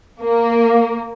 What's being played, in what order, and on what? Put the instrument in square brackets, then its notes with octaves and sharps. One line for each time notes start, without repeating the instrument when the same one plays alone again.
[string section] A#3